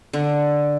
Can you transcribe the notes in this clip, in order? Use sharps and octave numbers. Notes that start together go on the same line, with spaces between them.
D3